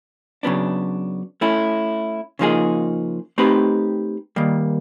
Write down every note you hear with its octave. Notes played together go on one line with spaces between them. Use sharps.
C#3 F#3 B3 D4
A3 C#4 E4
C#3 F3 A#3 D#4 G#4
A3 C4 D#4 G4 B4
D#3 G3 A#3